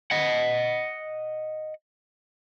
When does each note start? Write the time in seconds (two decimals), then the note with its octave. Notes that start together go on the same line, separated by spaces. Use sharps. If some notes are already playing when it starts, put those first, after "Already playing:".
0.11 D#5 F#5